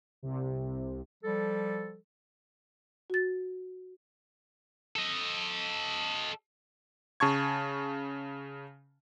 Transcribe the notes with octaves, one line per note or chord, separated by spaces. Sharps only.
C2 C3
F3 G3 A4
F#4 A6
A4 D#5
C#3 A5 C#6 G#6